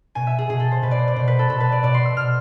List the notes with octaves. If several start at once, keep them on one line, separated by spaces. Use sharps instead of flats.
B2 G#5
E5
G#4
B2 G#4
A4
C5
B2 B4
D5
C5
D5
B2 C5
B4
A4
B2 A4
B4
D5
B2 D5
C6
E6
B2 F6